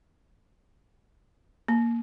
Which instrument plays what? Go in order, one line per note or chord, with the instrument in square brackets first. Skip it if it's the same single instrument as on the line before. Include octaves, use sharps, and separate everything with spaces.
[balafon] A#3